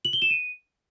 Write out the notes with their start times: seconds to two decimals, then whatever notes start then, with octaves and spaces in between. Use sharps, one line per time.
0.05 F#7
0.13 G7
0.22 E7
0.30 D#7